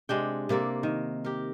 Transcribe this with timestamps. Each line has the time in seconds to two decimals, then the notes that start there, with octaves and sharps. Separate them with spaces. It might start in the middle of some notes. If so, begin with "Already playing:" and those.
0.09 C3 G#3 D4 G5
0.49 C3 A#3 A4 D5
0.83 D#3
1.25 G4 A#4